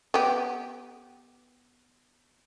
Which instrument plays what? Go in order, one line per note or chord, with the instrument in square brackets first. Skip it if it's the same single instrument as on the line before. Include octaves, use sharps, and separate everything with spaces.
[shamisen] B3 G4